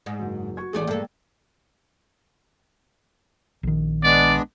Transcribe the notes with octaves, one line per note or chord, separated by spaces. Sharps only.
G#2
F#1 F#3
F#4 C#6 G#6
A1 D#2 A3 G#4 D5
G2 G#3 A#3 A4
A#1 D#3
G#3 B3 D4 D5